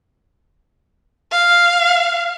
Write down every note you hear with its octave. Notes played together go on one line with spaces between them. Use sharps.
F5